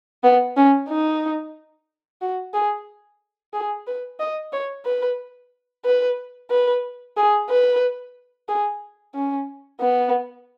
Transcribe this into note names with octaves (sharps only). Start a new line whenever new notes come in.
B3
C#4
D#4
F#4
G#4
G#4
B4
D#5
C#5
B4
B4
B4
G#4
B4
G#4
C#4
B3